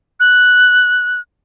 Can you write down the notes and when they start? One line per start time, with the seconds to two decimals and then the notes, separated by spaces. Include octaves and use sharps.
0.20 F#6